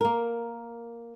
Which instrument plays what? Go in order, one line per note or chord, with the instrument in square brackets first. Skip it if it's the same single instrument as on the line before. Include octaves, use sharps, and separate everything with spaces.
[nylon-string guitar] A#3 A#4